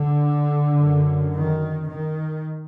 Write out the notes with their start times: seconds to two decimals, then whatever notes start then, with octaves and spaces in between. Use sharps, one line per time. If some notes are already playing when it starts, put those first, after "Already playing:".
Already playing: D3
0.82 F#2
1.36 D#3
1.89 D#3